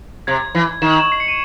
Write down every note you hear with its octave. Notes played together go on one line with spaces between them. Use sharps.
C3 G#6
E3
D#3 E7
F#7
E7
C7
C#7
D#7